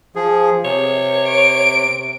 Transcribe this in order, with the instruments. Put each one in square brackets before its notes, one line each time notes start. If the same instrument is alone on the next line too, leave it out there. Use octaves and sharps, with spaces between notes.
[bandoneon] F3 G#4
[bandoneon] C3 [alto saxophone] C#5
[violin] D7